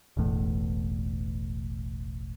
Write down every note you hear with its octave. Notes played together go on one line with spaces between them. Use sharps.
E1 A1 E2 A2